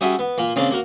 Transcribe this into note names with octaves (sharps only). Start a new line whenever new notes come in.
G3 C#4 F#4 G#4 E5
B3
A#2 A#3
C#3 A#3 C4 D4
A#3 F#4 A#4